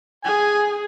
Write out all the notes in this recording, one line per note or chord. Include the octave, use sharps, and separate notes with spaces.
G#4 G#5